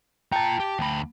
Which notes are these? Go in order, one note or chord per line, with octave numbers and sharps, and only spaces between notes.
F4 G5 A5 A#5
G4
D2 B5